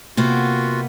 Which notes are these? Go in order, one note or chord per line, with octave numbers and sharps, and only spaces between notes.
C3 A#3 B3 F4 F#4